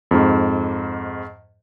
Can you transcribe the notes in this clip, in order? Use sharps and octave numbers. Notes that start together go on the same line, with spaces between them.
F2 G#2